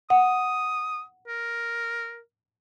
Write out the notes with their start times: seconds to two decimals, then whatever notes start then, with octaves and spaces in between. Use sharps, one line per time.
0.10 F#5 D#6
1.28 A#4